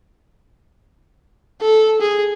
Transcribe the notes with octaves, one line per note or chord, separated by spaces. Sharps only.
A4
G#4